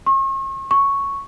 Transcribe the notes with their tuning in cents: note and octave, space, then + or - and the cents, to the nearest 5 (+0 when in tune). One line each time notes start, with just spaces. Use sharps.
C#6 -45
C#6 +0